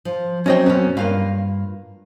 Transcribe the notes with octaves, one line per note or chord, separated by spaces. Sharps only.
F3
F#3 C4 C#4 F#4 D#5 G5
F#2 B2 C#4
G2 A#3 F4 F5